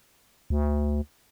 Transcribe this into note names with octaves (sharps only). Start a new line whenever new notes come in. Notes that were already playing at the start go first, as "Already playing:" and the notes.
D2